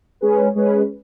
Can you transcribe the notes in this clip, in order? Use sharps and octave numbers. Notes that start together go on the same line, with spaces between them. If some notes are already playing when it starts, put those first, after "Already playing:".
G#3 C#4 G#4 B4
G#3 C#4 G#4 B4